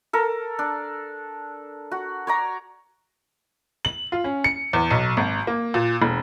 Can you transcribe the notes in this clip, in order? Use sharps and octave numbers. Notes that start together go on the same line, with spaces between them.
A4 A#4
D4
F#4
C#5 D5 A#5
F#7
F4
C#4
C#7
E2
B1
G#1
A#3
A#2
E1